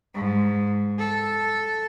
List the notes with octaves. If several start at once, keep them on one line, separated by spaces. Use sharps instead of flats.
G#2
A4